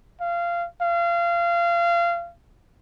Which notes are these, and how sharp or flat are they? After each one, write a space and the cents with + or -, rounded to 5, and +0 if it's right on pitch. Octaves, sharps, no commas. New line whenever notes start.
F5 -20
F5 -25